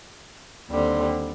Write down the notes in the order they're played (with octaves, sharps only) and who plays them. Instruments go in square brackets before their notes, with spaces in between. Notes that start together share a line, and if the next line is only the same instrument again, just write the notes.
[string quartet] D#2 D3 G3 C4